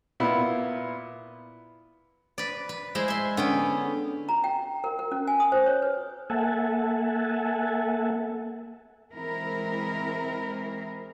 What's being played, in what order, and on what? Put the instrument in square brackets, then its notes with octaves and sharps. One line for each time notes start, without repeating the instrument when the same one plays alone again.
[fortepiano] A#2 B3 E4
[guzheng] B4 D5
B4
G#3 E4 C5
E5 C6
[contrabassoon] D3 [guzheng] B3 C#4 G5
[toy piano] A#5
G5
A#4
A#4
C#4
G#5
D#6
C5
C#5
B4
[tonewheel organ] A#3 A4 E5 F#5 G#5 A5
[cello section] E3 G#3 C4 E4 A#4